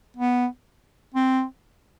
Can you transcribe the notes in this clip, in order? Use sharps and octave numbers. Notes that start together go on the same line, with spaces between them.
B3
C4